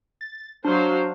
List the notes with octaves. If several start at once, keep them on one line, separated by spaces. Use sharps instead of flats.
A6
F#3 D4 C5 F5